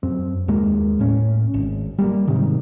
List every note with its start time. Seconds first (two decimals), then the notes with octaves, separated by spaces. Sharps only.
0.03 F#2 C4
0.48 D#2 G#3 A#3
0.99 A2 C#4
1.54 G#1
1.99 G3 A3 A#3
2.28 G#2 C3 D#3